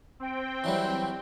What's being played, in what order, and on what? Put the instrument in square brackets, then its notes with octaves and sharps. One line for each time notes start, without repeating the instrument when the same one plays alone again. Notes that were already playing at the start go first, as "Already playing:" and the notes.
[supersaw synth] C4 G5
[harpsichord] E3 F#3 G3